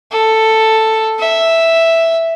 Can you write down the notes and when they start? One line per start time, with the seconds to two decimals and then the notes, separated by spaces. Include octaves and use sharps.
0.12 A4
1.19 E5